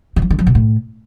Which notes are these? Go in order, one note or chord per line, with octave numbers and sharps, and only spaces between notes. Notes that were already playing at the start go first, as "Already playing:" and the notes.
D3
F3
D3
F3
B2
A2